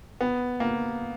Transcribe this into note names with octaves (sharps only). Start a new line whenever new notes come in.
B3
A#3